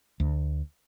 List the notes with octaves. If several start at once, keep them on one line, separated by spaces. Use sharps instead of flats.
D2